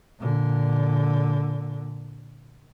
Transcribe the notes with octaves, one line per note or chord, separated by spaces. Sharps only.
A#2 D3